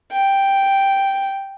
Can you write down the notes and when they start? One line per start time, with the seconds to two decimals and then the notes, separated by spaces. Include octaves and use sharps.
0.12 G5